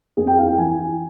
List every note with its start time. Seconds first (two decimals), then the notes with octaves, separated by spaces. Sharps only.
0.17 F2 G#4
0.27 G5
0.38 E4 F5
0.48 G5
0.58 E3 G#5
0.78 E4